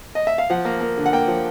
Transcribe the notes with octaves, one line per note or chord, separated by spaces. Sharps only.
D#5
E5
F5
F3 F#5
A#3
A#3
D3
F#5
A#3 G5
F3